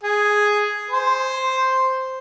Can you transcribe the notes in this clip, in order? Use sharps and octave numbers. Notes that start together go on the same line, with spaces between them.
G#4
C5